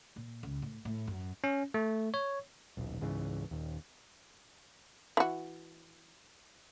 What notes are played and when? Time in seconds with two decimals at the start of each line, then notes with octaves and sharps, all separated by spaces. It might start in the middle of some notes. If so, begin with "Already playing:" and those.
0.16 A#2
0.43 C#2
0.62 A2
0.85 A2
1.07 F#2
1.44 C#4
1.74 A3
2.14 C#5
2.77 D#1 B1
3.00 C#2 G#2 C#3 E3
3.51 D#1 D#2
5.17 E3 F#4